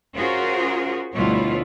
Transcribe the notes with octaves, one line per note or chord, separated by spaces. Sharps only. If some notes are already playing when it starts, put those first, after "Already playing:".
C#4 F4 F#4 G#4 A#4 C5
D2 B2 G3 E4 F4 C#5